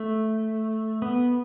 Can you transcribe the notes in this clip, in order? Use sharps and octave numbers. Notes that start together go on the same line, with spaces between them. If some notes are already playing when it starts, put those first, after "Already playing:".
Already playing: A3
B3